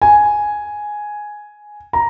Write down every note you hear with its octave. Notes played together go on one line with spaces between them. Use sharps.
G#5
A#5